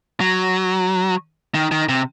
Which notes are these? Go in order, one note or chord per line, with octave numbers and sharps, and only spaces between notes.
F#3
D#3
D#3
C3